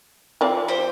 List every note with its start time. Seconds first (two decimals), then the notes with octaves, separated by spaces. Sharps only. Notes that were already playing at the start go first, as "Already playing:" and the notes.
0.41 F3 C4 D5
0.68 G4 C5